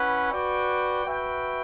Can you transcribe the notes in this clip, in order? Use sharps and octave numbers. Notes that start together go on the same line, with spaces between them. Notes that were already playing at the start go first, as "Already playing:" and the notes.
Already playing: C#4 E4 B4 F#5
F#4 B4 D5 G5
F#4 B4 E5 G5